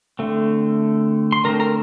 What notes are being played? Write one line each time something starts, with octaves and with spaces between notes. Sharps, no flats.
D3 A3 C4
C6
D3 A3 C4 A#4 A#5
A#4 A#5